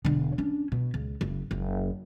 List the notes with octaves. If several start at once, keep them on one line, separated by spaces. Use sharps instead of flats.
E1 D3
C#4 D4
B2
C#2
F#1
F#1